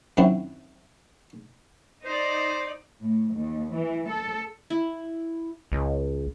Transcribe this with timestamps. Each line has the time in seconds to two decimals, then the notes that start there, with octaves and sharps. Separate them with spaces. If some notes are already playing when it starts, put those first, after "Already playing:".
0.17 F#2 D#3 F#3 C4 E4
2.05 D#4 C5 D5
3.03 A2
3.35 D#2
3.75 E3
4.09 A4
4.70 E4
5.72 C#2